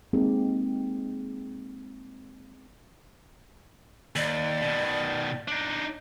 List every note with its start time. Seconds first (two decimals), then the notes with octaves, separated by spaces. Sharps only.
0.13 G#3 A#3 C4 D#4 G4
4.16 D#2 D5
4.62 B2 D#3
5.48 D4 D#4